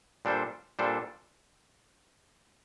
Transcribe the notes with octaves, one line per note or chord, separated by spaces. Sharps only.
A#2 G3 D4 A4 C5
A#2 G3 D4 A4 C5